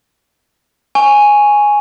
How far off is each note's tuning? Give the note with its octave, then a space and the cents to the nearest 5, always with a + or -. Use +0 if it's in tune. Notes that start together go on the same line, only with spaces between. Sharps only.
G#5 +0 C#6 +5